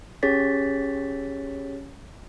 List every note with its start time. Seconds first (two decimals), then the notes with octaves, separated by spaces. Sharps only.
0.23 C#4 G4 G#4 C#5 A6 B6